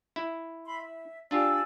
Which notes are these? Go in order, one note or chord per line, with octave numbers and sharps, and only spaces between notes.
E4
E5 B5 C6
E5
D4 F4 G4 D5 G#5 E6